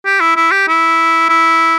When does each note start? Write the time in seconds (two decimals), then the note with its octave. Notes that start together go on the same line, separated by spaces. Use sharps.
0.05 G4
0.20 E4
0.36 E4
0.52 G4
0.68 E4
1.29 E4